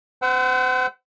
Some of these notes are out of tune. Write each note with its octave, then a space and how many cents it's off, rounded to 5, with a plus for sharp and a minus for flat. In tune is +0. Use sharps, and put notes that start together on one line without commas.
C5 -35 F#5 +30 E6 +0